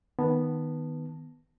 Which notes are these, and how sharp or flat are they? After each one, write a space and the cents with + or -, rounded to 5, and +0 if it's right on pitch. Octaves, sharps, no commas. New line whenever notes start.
D#3 +0 B3 -5 A5 +0